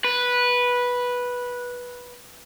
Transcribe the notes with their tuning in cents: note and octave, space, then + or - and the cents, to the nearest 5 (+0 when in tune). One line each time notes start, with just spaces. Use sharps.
B4 -10